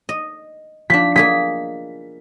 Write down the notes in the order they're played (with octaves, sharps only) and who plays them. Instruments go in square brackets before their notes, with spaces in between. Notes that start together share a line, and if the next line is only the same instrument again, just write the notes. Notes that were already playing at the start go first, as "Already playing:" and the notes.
[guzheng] D#5
[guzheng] F3 D4 [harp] B6
[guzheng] A#3 G#4 D#5 [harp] B6